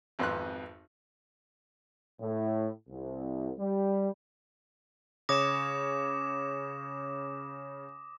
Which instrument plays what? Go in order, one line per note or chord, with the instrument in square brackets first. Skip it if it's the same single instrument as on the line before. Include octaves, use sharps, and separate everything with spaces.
[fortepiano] G#1 F2 B3 C6 F#6
[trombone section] A2
C2
G3
[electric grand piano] C#3 C#5 [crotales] D6 E7 [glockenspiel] D#6 A#6